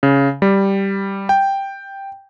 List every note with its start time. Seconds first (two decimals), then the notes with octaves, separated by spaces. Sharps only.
0.03 C#3
0.42 G3
1.29 G5